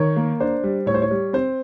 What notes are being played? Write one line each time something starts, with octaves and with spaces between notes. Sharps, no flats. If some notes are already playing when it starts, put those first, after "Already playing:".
Already playing: D#3 C#5
A#3
D4 C5
G3
A2 C#5
C5
C#5
G3
C4 C5